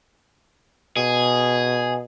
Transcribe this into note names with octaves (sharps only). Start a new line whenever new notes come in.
B2 G#4